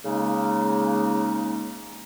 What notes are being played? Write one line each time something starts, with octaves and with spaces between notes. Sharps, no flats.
C#3 G#3 A#3 D#4